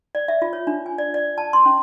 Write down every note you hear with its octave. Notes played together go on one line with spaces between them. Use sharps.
D5
E5
F4
C#5
D4
G#5
D5
D5
A5
C6
C#4